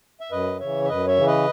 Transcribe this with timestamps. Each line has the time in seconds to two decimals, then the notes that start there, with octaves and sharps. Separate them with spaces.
0.21 E5
0.31 F#2 B4 D#5
0.60 C#3 E3 C#5 E5
0.84 E5
0.88 F#2 B4 D#5
1.07 C#5 E5
1.17 C#3 E3
1.26 B4 D#5